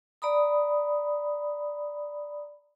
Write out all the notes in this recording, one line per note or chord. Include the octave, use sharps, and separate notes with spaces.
D5 A#5 B5 D#6